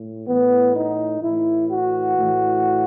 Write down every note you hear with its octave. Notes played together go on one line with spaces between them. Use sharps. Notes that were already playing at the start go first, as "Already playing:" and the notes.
Already playing: A2
A2 E3 B3
D#4
A2 E3 E4
F#4
A2 E3